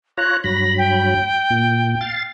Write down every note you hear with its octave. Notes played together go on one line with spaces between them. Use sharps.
F4 C#5 A#5 F#6
G2 F#3 B5 A#6
G5
A#2
F5 A6